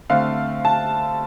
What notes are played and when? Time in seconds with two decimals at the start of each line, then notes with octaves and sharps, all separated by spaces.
0.10 D3 A3 C4 F5
0.65 A5